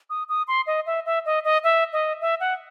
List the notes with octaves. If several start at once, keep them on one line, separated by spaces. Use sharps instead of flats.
D#6
D#6
C6
D#5
E5
E5
D#5
D#5
E5
D#5
E5
F#5